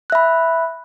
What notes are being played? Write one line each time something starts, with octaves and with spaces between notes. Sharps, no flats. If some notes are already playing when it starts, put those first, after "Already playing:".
E5 B5 F#6